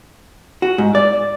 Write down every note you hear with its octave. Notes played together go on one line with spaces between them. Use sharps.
F#4
G#2
D5